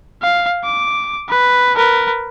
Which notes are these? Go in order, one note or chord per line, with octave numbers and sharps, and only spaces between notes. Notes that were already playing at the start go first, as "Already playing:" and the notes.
F5
D6
B4
A#4 B4